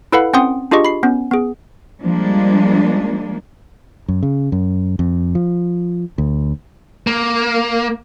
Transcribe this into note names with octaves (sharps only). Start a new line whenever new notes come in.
E4 A4 B4 F5 F#5 B5
C4 C#4 F#5 G5 C6 D#6
D4 F4 G4 G#4 D#5 C#6
B5 C7
B3 C#4
B3 G#4
F3 G3 G#3 A#3 D4
F#2
C#3
F#2
F2
F3
D2
A#3